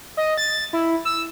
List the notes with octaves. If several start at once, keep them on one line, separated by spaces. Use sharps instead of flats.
D#5
A6
E4
E6